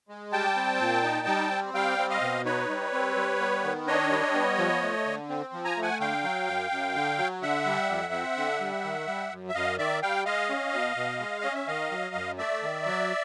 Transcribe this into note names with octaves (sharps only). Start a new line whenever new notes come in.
G#3
G3 G5 A5
C4
A#2
D#4
G3
C4
G3 F5 G5
C4
D#5 F5
B2
D#4 B4 C#5
G3
C4
G3
B3
D#3
D4 C#5 D#5
G3
B3
F3
A3
D3
C4
F3
G#5 A#5
A3
F#5 G#5
D3 F5 G5
F#3
F#2
F#2
D3
F#3
D3 E5 F#5
G3
F2
C4
D3
G3
D#3
G3
F#2
E5
F#2 D#5 F5
D#3 D5 E5
G3 F5 G5
G#3 D#5 F5
C#4
B2
B2
G#3
C#4 D#5
E5
D#3 D#5 F5
F#3
F#2
A3 D5 E5
D#3
F#3